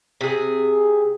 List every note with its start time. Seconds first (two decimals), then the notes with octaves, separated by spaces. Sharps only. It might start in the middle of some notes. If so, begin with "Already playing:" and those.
0.21 C3 G#4